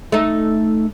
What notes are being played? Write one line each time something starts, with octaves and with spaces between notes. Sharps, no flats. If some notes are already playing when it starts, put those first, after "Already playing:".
A3 D#4